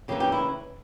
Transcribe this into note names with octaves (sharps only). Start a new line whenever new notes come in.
C#3 E3 A#3 D4 G4
G4
E4